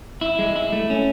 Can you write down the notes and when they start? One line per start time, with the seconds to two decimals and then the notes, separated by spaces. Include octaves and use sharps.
0.21 E4
0.39 G#3
0.56 E4
0.73 A3
0.90 C#4